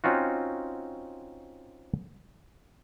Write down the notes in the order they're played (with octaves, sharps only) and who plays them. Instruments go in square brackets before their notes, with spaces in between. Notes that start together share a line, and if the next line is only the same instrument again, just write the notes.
[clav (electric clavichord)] C4 C#4 D#4 F4 F#4